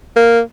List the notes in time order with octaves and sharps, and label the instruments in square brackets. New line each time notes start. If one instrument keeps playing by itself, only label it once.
[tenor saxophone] A#3